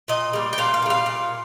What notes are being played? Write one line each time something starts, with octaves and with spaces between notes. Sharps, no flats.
A#2 D#5
G3 A#3
G5
A#2 F5
F5
A#3
G3 F5
A#2